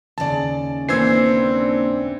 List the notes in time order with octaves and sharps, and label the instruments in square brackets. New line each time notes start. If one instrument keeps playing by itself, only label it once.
[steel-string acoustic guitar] D#2 C#3 [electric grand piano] D5 A5
[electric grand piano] E3 C5 G#6 [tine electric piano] A#3 E6 C7 [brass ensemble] C4 D4